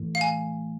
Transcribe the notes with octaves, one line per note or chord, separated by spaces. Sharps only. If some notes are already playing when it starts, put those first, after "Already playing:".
Already playing: A2 E3 A3
F5
G#5